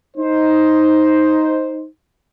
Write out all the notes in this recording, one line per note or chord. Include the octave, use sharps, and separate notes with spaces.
D#4 C5